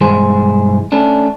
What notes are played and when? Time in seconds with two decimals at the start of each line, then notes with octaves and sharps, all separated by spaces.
0.01 B1 G2 E3 G#3 G#4 C5
0.92 A3 C#4 D4